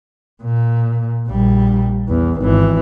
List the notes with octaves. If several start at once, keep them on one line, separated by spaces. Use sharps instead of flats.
A#2
A#1 G3
E2
G#1 E3